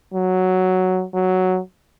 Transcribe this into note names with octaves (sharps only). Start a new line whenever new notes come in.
F#3
F#3